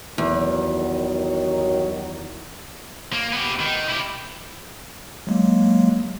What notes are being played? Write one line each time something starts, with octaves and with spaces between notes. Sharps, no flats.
E2 G2 D#3 F#3
A#3
B3 G4
D#3
E4 G4
F#3 G#3 A#3